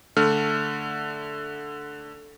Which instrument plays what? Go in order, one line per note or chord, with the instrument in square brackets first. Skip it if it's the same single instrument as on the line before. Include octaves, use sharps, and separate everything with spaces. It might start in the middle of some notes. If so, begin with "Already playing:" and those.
[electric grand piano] D3 A3 F6